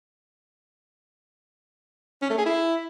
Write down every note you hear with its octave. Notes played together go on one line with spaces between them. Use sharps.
C#4
A3
G#4
E4